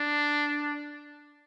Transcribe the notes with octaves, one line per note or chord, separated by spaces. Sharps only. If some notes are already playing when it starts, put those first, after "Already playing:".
Already playing: D4